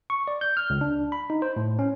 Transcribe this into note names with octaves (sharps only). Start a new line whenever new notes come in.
C#6
D5
G6
F6
C#2
D4
B5
D#4
C5
A2
C#4